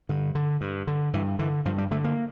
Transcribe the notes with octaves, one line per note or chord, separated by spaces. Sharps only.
G2 D3
D3
G2
D3
G2 E3
D3 E3
G2 F3
G3
D3 A3
A#3